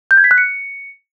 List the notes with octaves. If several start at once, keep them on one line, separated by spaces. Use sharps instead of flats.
G6
G#6
B6
F#6
C#7